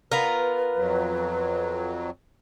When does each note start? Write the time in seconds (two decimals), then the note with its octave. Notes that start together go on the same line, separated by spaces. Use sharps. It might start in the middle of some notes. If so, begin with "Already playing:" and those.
0.12 B3 F4 A#4 B4
0.77 F2 F#3